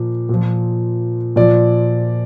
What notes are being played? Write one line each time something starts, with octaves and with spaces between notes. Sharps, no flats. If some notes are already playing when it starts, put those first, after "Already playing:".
Already playing: A#2 F3
A#2 F3
A#2 F3 D5